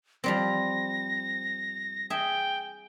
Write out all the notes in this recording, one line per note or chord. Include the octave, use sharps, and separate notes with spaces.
F3 G3 C4 A#6
G#4 E5 G5